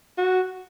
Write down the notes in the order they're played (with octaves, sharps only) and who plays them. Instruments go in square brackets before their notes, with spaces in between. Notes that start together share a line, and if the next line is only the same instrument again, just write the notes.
[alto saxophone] F#4